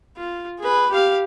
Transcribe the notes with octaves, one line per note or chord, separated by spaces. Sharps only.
F4
G#4 B4
G4 F5